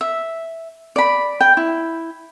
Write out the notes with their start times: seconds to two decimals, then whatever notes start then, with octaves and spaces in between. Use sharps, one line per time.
0.01 E5
0.96 D5 B5
1.41 G5
1.57 E4